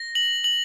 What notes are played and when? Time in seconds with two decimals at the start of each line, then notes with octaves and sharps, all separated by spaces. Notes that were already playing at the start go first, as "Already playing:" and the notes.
Already playing: A#6
0.15 F#7
0.44 F#7